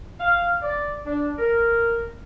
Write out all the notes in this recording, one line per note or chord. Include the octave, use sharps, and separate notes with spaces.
F5
D5
D4
A#4